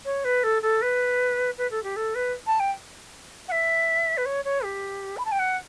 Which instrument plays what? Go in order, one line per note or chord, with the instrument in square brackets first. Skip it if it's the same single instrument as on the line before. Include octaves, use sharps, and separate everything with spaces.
[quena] C#5
B4
A4
A4
B4
B4
A4
G4
A4
B4
A5
G5
F#5
E5
B4
C#5
C#5
G4
B5
A5
G5
F#5